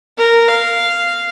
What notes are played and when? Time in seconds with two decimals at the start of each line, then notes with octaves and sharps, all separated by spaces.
0.18 A#4
0.48 F5